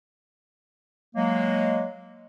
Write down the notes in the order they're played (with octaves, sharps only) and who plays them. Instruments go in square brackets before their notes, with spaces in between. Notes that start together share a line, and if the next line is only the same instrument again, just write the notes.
[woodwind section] F#3 G#3 A#3